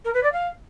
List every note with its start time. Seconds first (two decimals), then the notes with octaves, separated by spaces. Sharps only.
0.05 A#4
0.14 B4
0.23 D5
0.32 F5